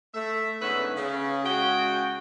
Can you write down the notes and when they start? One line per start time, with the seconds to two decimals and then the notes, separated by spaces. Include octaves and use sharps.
0.14 A3 E5
0.60 G#2 D3 B3 C#4 B4 E5
0.96 C#3
1.45 C#3 G#3 F#4 G#4 G5